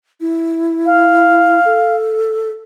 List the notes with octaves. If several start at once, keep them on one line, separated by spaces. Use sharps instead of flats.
E4
F5
A4